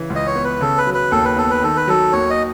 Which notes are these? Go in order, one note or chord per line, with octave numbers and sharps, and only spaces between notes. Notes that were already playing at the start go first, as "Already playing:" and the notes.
Already playing: C#3 E3
C#2
D#5
C#5
B3
B4
C#3 A4
B4
F#3
B4
D#2 A4
B4
B3 A4
B4
D#3 A4
B4
F#3 A4
D#2 C#5
D#5